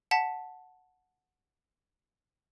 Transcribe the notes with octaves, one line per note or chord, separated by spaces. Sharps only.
F#5 A5 B6